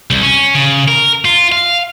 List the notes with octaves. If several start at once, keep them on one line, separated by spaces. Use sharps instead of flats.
C2
C#4
C#3
A#4
F4
F5